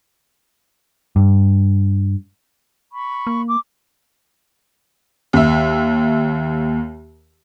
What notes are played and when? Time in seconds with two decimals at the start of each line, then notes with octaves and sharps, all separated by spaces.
1.16 G2
2.92 B5 C#6
3.27 A#3
3.49 D6
5.33 D#2 E5